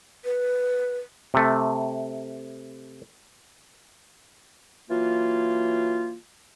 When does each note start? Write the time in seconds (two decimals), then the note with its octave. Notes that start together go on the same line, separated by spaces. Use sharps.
0.25 B4
1.34 C3 A3
4.89 E3 F#3 A#3 F4